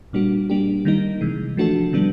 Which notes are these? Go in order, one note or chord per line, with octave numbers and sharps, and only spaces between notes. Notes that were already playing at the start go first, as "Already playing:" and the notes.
A#2 G3 A#3 D4 F#4
G3 A#3 D4 G4
D#3 G3 A#3 D#4
C3 E3 G#3
F3 A3 D4 F#4 A4
C3 D#3 G3 B3 D4